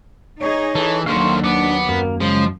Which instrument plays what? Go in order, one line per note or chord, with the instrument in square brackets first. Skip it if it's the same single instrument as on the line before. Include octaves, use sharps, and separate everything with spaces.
[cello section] D#4 G#4 [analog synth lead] C#5
[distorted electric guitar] E3 [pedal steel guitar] A4
[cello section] D#2 F#3 [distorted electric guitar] D3 D#3 [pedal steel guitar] C5 F5 [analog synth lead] C#6
[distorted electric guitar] B3 [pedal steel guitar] D4 [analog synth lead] D6
[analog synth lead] F#2 [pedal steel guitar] A#3
[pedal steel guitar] C#3 G#3 [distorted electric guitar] F3